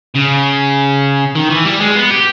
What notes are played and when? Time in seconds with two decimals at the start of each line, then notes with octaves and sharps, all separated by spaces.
0.15 C#3
1.36 D#3
1.51 E3
1.66 G3
1.81 G#3
1.96 B3
2.10 G4